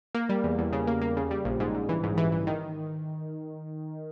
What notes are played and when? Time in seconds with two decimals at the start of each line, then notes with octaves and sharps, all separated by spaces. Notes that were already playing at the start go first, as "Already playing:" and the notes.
0.14 A#3
0.29 G3
0.44 E2
0.58 E2
0.73 C#3
0.87 A#3
1.01 A#3
1.17 C#3
1.31 G3
1.45 A#1
1.60 G#2
1.75 G#2
1.89 E3
2.03 G#2
2.17 E3
2.32 E3
2.47 D#3